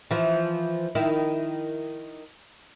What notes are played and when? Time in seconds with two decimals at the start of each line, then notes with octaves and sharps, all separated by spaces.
0.11 E3 F3
0.95 D#3 E4